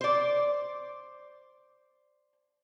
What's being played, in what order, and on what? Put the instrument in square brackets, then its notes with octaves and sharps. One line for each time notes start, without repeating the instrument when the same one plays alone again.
[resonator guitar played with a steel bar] C5 D5